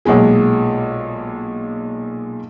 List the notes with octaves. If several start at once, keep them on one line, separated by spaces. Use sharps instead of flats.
B1 A#2 G#3 G#4